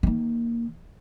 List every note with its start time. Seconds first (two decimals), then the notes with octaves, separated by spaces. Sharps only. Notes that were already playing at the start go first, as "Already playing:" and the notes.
0.03 D#3 A#3